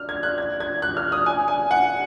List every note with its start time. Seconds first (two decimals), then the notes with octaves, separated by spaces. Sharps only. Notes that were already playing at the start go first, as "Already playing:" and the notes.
Already playing: F6
0.09 G#6
0.23 F#6
0.38 G#6
0.60 G#6
0.82 F#6
0.97 F6
1.12 D#6
1.26 G#5
1.48 G#5
1.71 F#5